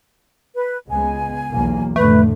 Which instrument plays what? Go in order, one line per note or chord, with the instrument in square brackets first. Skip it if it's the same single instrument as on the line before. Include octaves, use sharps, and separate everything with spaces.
[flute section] B4
[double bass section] C#2 G#3 B3 [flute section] G#5
[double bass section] B1 E2 A#3
[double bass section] F2 A2 D3 [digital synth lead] A3 [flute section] B4